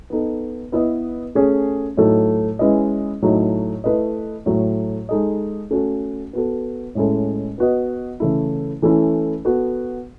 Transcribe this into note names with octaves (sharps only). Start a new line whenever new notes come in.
B3 D#4 A4
B3 E4 B4 D#5
A3 C#4 G#4 C#5
A2 F#3 A3 D#4 A4
G#3 C#4 E4 B4 D#5
A2 F#3 A3 D#4
A3 E4 B4 D#5
A2 F#3 A3
G#3 D#4 A4 D#5
A3 C#4 F#4 A4
B3 F#4 A4
A2 G#3 C#4 E4 A4
B3 F#4 B4 D#5
C#3 E3 A3 E4
E3 A3 C#4 E4
B3 F#4 A4